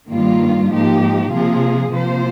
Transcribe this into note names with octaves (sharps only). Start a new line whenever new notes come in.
G2 D#3 G3 A#3 F4
G#2 F3 A#3 D#4 G4
C3 F3 A#3 F4 G#4
C3 F3 A#3 F4 C5